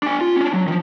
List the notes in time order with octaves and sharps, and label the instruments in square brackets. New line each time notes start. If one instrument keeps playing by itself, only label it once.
[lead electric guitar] D4 G#5
F4
C#4 D4
F#3
D#3 F3